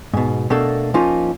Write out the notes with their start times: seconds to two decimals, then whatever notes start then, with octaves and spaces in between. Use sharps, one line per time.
0.13 G#2 B2
0.50 B2 A3 A#3 D4 A4
0.94 F3 A#3 C#4 D#4 F4